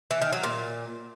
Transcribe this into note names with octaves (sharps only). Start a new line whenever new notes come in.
E3
D#3
F#3
A#2